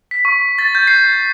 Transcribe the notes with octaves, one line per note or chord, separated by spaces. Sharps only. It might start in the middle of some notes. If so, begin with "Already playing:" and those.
B6
C#6
A6
G6
C7